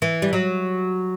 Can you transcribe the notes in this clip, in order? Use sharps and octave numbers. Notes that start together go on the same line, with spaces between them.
E3
G3
F#3